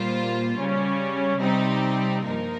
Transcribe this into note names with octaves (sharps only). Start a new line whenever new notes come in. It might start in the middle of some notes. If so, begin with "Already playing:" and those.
Already playing: A#2 G3 A#3 F4 C5
C#3 G3 C#4
C3 G3 C4 D#4 G4
G2 F3 A#3 D#4 A#4